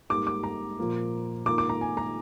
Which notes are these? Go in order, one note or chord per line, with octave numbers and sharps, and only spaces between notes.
G#2 G3 A#3 D6
D6
A#5
A#2 F3 A#3 F4
D#3 A#3 F4 D6
D6
A#5
G#5
A#5